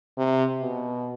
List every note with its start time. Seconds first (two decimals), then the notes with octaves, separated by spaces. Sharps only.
0.18 C3
0.61 B2